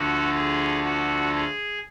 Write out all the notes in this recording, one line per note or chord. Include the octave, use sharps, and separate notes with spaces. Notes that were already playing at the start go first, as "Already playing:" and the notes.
Already playing: D2 D3 F3 F#4
G#4
F#4
G#4